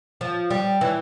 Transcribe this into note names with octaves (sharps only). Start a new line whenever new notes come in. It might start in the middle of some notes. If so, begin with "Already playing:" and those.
F3
G3
E3